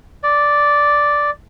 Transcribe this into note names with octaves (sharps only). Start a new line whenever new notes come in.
D5